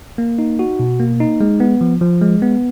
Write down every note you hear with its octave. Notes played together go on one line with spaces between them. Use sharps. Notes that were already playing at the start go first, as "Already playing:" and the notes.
A#3
D#4
F#4
B2
A#3
D#4
G#3
B3
F3
F3
G#3
B3